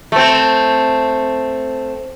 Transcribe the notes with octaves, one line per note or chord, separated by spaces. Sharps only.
A3 C4